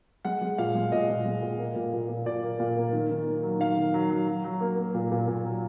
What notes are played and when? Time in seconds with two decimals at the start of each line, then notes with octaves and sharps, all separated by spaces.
0.25 G#3 F#5
0.42 G#3
0.58 A#2 F5
0.75 G#3
0.92 A#2 D#5
1.09 A#2
1.25 G#3
1.42 A#2
1.59 A#3
1.76 A#2
1.93 A#2
2.09 A#2
2.26 A#2 D5
2.43 A#3
2.60 A#2
2.77 A#3
2.93 D#3
3.11 D#3
3.27 A#3
3.43 F#3
3.60 D#3 F5
3.76 D#3
3.94 F#3
4.10 F#3
4.28 F#3
4.44 F#3
4.61 A#3
4.78 A#3
4.94 A#2
5.12 A#2
5.28 A#2
5.45 F#3